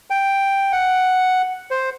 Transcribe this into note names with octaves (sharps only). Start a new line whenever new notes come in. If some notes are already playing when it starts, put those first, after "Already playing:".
G5
F#5
C5